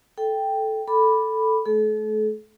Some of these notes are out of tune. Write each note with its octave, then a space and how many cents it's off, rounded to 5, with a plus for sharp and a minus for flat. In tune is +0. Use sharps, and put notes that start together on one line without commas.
A4 -10 G5 +0
A4 +0 B5 +0 D6 +0
A3 -35 A4 -40